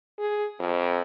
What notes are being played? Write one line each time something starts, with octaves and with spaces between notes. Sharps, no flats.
G#4
F2